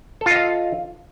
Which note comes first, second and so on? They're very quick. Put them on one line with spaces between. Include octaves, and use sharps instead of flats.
A4 F4 D#5 F5